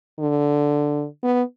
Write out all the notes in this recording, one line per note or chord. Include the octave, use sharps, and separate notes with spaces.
D3
B3